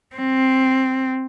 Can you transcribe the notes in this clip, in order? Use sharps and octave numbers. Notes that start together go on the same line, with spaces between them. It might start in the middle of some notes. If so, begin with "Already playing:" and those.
C4